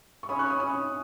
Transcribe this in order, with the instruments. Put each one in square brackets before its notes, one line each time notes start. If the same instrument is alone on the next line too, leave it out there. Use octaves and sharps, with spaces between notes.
[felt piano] C#6
[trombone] C#4 [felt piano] B5 D#6
[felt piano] C#6 F#6
B5 D#6
[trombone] C#4 [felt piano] B5 D#6